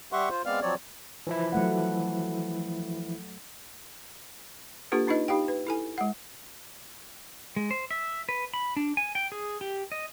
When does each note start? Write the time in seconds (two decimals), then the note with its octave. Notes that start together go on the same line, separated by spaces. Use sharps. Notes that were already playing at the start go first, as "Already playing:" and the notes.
0.12 G3 G4 E5 F#5 C6 C#6
0.30 F4 C5
0.46 G#3 B3 C4 D5 F5 F6
0.62 F3 F#3 C4 C#5 D5
1.27 E3 F3 E4
1.52 F#3 A3 F#5
4.92 A#3 D4 F4 G4 A4 B4
5.07 D4 D#4 F4 B4 D#5
5.28 D#4 G4 F5 G5
5.48 B4
5.67 E4 A4 G#5
5.98 G#3 F#5
7.56 G#3
7.71 C5
7.91 E5
8.29 B4
8.54 B5
8.76 D4
8.97 G#5
9.15 G5
9.32 G#4
9.61 G4
9.92 D#5